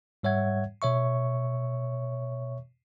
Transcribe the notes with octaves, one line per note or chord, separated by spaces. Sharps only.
G#2 G3 C#5 E5 F#5 G#6
B2 C#5 E5 C#6